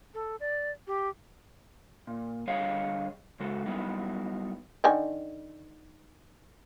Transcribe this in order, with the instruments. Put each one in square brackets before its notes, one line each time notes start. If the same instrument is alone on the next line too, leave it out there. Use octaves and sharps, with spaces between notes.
[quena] A4
D5
G4
[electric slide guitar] A#2
D3 G3 G#4 C#5 D#5 F5
C#3 G#3 F#4 A4
F#3 G3 A3 B3 D#4 E4
[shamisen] D3 D#3 G#5